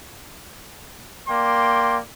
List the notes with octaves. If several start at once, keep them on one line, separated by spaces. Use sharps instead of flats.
A#3 D5 G5 C6